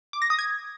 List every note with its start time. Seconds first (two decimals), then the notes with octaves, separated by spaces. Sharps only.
0.13 D6
0.22 A#6
0.30 D#6
0.39 G#6